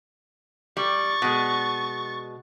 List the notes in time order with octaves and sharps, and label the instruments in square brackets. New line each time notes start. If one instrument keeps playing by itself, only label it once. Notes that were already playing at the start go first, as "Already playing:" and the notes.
[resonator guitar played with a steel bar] G3 [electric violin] C#6 A6
[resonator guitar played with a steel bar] B2 G#3